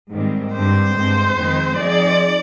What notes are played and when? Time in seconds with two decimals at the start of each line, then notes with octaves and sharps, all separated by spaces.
0.12 G#2 D#3 G3 C4
0.53 G2 D3 G3 C4 C5
0.94 G2 D3 G#3 C4
1.35 F2 D#3 G#3 C4
1.76 F3 C4 D#4 G#4 D5